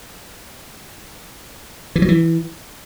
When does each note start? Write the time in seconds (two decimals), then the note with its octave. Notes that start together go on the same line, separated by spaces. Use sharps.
1.96 E3
2.02 F#3
2.08 E3